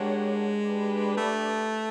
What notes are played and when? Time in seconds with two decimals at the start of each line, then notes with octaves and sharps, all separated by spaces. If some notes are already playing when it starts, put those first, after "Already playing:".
Already playing: G#3 D4 G4 A#4 C#5 F#5
0.62 D4 G4 B4 D5
1.17 A3